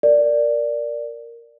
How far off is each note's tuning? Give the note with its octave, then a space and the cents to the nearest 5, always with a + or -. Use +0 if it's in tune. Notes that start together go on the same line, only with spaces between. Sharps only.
A#4 +0 D5 +0